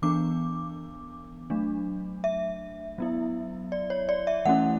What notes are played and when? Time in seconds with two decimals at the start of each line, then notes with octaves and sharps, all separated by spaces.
0.02 E3 B3 D4 D6
1.50 F#3 A3 D4
2.24 E5
2.98 F#3 B3 E4
3.72 D5
3.90 C#5
4.09 D5
4.27 E5
4.45 E3 A3 C#4 E4 F#5